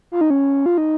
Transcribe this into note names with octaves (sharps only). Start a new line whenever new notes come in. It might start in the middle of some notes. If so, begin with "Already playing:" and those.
F4
D#4
C#4
F4
D#4